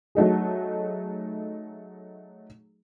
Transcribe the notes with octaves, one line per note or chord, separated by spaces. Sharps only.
F#3 A3 D#4 G#4